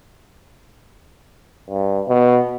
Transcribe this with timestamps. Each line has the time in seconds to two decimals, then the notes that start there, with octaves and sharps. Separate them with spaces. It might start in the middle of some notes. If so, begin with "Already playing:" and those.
1.70 G2
2.08 B2